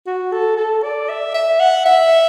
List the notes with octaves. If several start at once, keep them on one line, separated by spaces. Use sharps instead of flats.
F#4
A4
A4
D5
E5
E5
F#5
E5